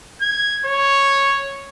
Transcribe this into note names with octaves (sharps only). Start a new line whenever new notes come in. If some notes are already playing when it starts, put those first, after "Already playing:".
G#6
C#5